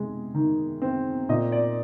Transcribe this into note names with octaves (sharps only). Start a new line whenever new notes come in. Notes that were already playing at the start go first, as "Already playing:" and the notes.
Already playing: C3 G#3
D#3
C4
A#2 D#5
D5